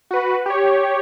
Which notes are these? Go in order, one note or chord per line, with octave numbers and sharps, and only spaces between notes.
F#4 B4
G4 C#5